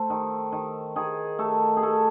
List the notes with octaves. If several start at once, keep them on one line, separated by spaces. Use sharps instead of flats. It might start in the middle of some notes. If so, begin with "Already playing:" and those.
Already playing: A3 A4 C5
D#3
D#3
D#3 G#4
A3 A4
G#4
A3 A4